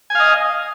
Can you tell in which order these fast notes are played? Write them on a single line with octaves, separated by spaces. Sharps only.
G#5 F5 D#5